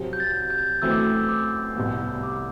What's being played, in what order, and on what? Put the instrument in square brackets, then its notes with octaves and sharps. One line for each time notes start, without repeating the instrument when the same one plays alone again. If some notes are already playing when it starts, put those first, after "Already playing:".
Already playing: [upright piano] C2 C3 F#3 C4
[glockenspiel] G6
A6
G6
[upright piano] F#2 E3 A3 C4 [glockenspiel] E6
[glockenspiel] D6
E6
D6
[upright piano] C2 C3 G3 B3
[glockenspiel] D6